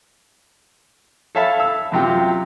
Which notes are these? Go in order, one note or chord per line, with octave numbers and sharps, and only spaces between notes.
A4 C#5 E5 F5 A5 B5
E6
F#2 C3 F#3 F4 G4